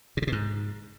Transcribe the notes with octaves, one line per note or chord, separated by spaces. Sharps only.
C3
C#3
B2
G#2